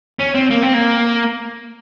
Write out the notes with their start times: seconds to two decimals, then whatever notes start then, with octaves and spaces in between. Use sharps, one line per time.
0.19 C#4
0.34 C4
0.50 A#3
0.62 C4
0.74 A#3